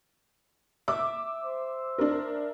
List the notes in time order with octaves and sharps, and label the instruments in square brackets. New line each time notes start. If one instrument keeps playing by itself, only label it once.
[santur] E5 [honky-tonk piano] D6
[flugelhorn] C5
[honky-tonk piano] D4 A#4